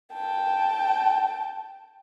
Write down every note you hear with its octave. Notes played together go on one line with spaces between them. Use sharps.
G5 A5